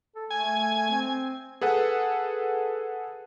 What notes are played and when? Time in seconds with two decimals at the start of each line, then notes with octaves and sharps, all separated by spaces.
0.16 A4
0.31 A3 G#5
0.91 C4
1.61 G#4 A4 B4 F#5